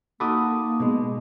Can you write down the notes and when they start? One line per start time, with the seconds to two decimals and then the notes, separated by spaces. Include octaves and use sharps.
0.20 A#3 D#4 F#4 A4 B5 D6 D#6
0.80 B2 G#3